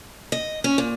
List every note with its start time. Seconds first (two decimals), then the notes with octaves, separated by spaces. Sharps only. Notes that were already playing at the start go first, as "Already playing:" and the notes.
0.32 D#5
0.64 C#4
0.78 A#2